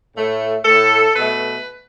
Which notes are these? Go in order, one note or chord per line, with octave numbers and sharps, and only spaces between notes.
A2 A3
A2 A3 A4
B2 A3 B4